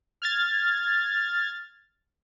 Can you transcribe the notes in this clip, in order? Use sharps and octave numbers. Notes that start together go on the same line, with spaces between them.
F6 G#6 A6